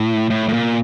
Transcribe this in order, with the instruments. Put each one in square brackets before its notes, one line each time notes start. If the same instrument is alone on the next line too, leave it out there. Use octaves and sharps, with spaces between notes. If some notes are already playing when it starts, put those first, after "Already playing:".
Already playing: [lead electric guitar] A2
A2
A2
A#2